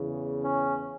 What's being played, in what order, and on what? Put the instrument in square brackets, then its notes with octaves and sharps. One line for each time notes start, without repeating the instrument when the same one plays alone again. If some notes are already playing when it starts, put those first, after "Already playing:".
Already playing: [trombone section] E2 C#3 E3
C#4